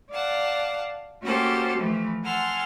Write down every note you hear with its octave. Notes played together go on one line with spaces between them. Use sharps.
D5 F5 F#5 A5
A#3 C#4 F#4 G4 A4 C5
E3 F3 A3
F#5 G#5 A5 C6 E6 F6